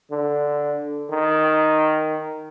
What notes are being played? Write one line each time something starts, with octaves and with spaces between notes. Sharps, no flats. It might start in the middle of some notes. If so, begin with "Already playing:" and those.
D3
D#3